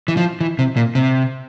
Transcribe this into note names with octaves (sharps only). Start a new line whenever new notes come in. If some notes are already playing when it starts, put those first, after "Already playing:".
E3
F3
E3
C3
A#2
C3